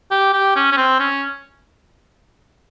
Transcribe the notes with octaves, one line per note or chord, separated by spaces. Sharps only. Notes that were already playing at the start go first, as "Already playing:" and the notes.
G4
G4
C#4
C#4
C4
C#4